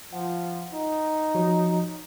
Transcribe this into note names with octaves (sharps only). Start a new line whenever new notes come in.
F3 F#5
D#4
F3 F#4 C#5